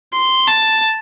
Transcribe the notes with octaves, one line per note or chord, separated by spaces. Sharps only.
C6
A5